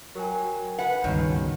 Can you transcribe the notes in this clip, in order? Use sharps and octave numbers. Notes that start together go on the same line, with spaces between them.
F#3 A#4 G5 G#5
F#4 B4 F#5
C#2 G2 B2 D#3 C#4